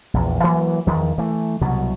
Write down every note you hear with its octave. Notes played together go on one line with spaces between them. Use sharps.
A#1 E2
E3 F#3 A#3
E2 D#3 F3
E3 A3
C2 B2 F#3